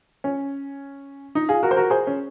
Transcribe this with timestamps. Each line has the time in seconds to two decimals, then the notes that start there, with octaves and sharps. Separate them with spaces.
0.24 C#4
1.35 D#4
1.49 F4 G#4
1.63 F#4 A#4
1.71 C5
1.76 F#4 A#4
1.90 G#4 C5
2.07 C#4